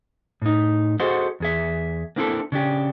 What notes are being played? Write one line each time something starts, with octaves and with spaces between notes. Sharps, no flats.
A2 D#4
F#4 G#4 A4 C5 D#5 F#5
E2 G#4 E5
A#3 C4 D4 E4 F#4 A4
C#3 D4 G4